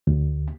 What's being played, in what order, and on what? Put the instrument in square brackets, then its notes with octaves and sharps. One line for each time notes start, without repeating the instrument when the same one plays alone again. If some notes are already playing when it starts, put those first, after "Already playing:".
[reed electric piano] D2